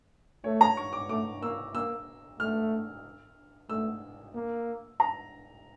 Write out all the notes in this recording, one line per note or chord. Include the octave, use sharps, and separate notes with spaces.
A3 C#5
A#5
C#6
D6
A3 D6
A#3 E6
A#3 E6
A3 F6
A3 E6
A#3
A#5